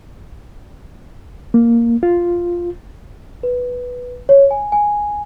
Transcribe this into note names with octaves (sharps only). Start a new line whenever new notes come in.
A#3
F4
B4
C#5
G#5
G#5